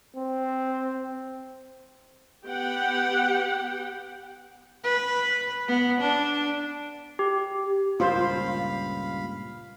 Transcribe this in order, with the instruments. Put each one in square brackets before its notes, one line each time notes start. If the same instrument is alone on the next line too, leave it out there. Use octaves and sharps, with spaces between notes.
[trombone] C4
[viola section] B3 G4 F#5 G5
[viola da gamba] B4
B3
D4
[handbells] G4
[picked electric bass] C#2 G2 A#2 [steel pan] F4 C5 [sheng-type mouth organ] F5 B5